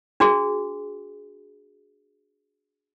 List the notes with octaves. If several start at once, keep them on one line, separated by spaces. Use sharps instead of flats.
D4 F#4 G#4